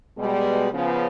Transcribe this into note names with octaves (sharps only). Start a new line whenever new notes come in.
B2 G3 G#3
C#3 F3 B3